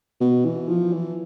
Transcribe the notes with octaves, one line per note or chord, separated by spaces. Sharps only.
B2
E3
F3
E3